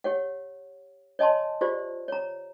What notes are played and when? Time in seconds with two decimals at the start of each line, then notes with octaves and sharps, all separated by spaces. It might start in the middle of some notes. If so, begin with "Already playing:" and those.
0.04 G4 C#5 F#5
1.19 C#5 D#5 G#5 A5 C6
1.61 F4 G4 C5 D5
2.08 C#5 A#5